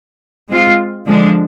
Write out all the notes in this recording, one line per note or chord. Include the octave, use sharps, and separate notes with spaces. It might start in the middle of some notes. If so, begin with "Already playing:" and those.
G#3 C4 F4
D3 F3 G#3 D4